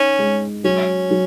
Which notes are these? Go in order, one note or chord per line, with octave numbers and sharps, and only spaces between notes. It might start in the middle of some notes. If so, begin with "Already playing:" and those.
Already playing: C#4 D#4
G#3
F#3 C#4
F#3